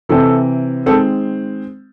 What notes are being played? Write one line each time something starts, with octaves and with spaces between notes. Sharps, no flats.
C3 E3 C4 A4
D#3 G#3 C4 A4